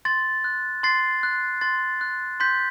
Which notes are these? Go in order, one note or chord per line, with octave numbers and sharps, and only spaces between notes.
C6 A6
F#6
C6 A6 C7
F#6
C6 A6
F#6
C6 G6 B6